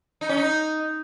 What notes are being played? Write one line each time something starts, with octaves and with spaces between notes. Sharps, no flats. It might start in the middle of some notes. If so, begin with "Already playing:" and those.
D#4
C#4
D#4